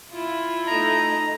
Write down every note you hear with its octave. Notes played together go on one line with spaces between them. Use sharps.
E4 F4
A3 D#4 D#5 A#5